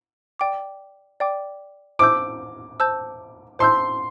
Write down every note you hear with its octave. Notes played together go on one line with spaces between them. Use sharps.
D5 G5 D6
D5 G5 D6
C5 A5 D6 E6 G6
C5 A5 E6 G6
C5 A5 C6 E6 G6